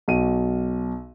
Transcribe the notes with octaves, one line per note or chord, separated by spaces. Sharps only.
B1 F#4 D#7